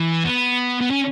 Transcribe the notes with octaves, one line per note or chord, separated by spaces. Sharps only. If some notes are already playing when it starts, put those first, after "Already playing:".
Already playing: E3
B3
B3
C#4